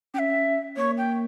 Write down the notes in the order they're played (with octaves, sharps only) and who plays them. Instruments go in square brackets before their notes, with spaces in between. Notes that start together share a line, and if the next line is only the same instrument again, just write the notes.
[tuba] C#4 [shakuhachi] G5
[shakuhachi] E5
[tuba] A#3 [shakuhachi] C#5
[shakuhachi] G5